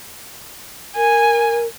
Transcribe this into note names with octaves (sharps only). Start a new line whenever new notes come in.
A#4 G#5